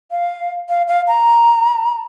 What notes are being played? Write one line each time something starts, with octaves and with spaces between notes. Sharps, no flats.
F5
F5
F5
A#5